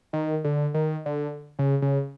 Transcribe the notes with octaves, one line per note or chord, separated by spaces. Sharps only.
D#3
D3
D#3
D3
C#3
C#3